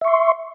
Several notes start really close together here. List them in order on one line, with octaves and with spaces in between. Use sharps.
E5 C#6 C6